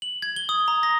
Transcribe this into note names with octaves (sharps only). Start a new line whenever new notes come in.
F#7
G#6
G7
D#6
A#5
A#6